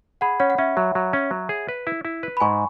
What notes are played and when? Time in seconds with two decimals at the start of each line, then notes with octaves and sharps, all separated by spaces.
0.21 G#4 F#5 B5
0.40 C#4 C#5 F#5
0.50 F#5
0.58 C#4 E5
0.77 F#3 E5
0.95 F#3
1.13 C#4
1.31 F#3
1.49 G#4
1.69 B4
1.87 E4
2.05 E4
2.23 B4
2.37 B5
2.40 G#2 G#5 C#6